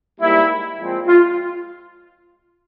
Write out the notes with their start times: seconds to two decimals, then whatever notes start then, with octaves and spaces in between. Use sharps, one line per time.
0.20 G#2 G3 A#3 E4
0.78 A#2 F3 G#3 C4
1.06 F4